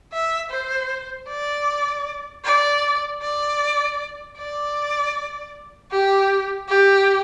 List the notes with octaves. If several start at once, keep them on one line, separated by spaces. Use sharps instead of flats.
E5
C5
D5
D5
D5
D5
G4
G4